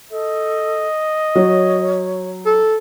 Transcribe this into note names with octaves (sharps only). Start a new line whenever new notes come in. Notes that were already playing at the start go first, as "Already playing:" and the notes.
A4 D#5
F#3 C#5
A4